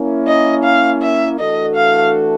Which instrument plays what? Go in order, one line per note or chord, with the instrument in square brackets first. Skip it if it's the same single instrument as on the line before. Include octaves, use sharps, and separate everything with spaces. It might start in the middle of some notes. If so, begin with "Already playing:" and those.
Already playing: [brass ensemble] A#3 C#4 E4
[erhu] D#5
F5
E5
[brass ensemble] E3 A3 D4 F#4 A4 [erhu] D#5
[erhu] F5